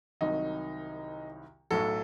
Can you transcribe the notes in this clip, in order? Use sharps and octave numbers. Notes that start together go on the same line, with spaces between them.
C2 C3 D#3 F#3 D#4
B1 A2 F#3 A4